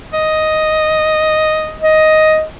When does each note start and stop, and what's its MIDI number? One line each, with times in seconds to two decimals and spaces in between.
0.13 1.79 75
1.82 2.44 75